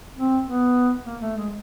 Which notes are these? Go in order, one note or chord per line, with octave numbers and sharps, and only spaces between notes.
C4
B3
A#3
A3
G#3